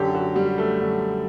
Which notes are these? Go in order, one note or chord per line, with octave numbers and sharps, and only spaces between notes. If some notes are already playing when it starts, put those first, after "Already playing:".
Already playing: F#2 D3 F#3 G4
F#4
G3
A3
F#2 D3 F#3